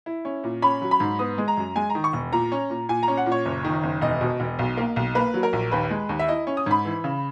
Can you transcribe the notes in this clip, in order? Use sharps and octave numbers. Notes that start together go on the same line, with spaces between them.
E4
C#4
A#2
C#4 B5
F#3
B5
G#2
B3 D#6
G#3
A#5
F#2
G#3 G#5
A#5
D#3
C#6
E1
A#2 A#5
C#4
A#2
A#2 G#5
A#5
C#4
F#5
A#2
C#5
F#1
D#3
F#1
E1 D#5
B2
E1
B1
A#3
B1
A#3 B4
F#3
A#4
A#1
D#2 B4
G#3
D#2
E5
E4 D#5
C#4
D#6
G#2 B5
E3
C#3